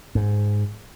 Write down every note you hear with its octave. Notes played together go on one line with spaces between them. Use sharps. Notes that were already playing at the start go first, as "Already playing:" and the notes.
G#2